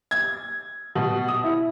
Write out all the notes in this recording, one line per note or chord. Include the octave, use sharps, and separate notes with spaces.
G#6
B2
D#6
E4